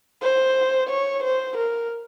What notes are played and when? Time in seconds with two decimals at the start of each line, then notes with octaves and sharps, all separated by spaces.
0.22 C5
0.89 C#5
1.23 C5
1.57 A#4